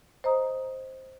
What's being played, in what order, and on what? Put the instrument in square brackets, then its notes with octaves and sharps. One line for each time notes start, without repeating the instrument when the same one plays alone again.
[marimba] C5 D#5 A#5 D#6